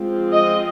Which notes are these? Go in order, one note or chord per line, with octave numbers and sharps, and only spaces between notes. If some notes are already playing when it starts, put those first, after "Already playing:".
Already playing: F3 G#3 C4
D#5